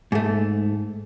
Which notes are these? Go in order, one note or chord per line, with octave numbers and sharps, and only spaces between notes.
G#2 A3